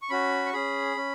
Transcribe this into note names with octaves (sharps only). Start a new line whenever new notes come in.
C#6
C#4 F#4 B5
C#6
C#4 G#4 B5
C#4